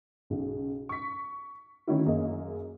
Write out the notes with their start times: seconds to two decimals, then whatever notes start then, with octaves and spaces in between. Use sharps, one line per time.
0.30 B1 C#3
0.89 C#6 B6
1.87 D3 D#3 A3 C#4 E4 F#4
2.06 F#2 A#3 G#4 D#5